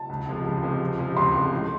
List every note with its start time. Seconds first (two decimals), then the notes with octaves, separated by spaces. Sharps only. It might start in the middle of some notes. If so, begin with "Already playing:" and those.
Already playing: A5
0.09 C#2
0.27 C3 F3 G#3
0.45 C#2
0.63 C3 F3 G#3
0.81 C#2
0.99 C3 F3 G#3
1.16 C#2 C6
1.34 C3 F3 G#3
1.52 A2